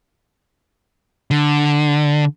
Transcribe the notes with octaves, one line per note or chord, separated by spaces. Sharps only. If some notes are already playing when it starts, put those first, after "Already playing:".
D3